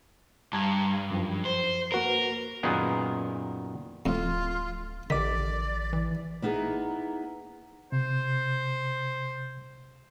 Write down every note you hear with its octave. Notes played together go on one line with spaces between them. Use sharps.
G2 A5 A#5 G#6
F#2 F3
C5
A#3 F#4 A#4 B4
F#2 A#2 D#3 B3 G#4
D1 F2 A2 F4
A1 D3 D#3 D5 D6 B6
E3
A#3 B3 D#4 E4 G#4
C3 C5